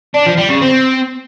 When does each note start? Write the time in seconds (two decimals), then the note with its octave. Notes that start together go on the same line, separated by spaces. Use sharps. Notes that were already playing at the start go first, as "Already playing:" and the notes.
0.14 D4
0.26 F3
0.38 G3
0.50 C#3
0.62 C4